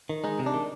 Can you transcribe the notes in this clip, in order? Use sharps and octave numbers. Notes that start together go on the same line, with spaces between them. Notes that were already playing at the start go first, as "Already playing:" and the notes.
D#3
G#3 D#4
C3
D4
D#3